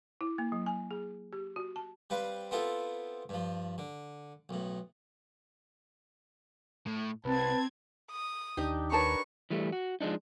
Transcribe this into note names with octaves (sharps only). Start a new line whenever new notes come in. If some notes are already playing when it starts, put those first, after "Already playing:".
E4
A#3
F#3
G#5
G#4
G4
F#4
A5
G3 C4 B4 F5
B3 C4 E4 F4 A4
G2 F3
D3
B1 A2
A2
C2 C4 B4 A5 G#6
D#6
D#2 D4 D#4 G4
D4 A#4 B4 C#5 A5 A#5 C#6
E3 G3 A3
F#4
F3 G#3 B3 D4 D#4